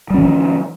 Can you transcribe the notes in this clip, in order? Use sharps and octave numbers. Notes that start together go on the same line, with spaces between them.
D#3 F3 G3 C#4